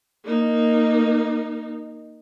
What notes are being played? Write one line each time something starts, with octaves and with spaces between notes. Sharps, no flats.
A#3 D#4